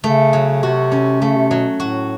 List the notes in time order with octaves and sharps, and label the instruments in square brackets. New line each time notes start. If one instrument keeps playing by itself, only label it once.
[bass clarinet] C#3 [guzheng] A3
[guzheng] F#3
[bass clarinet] C3 [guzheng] F#4
[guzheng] C#4
[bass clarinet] C#3 [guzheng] A3
[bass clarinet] C3
[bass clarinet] B2 [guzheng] F#3
[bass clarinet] A2 [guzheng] F#4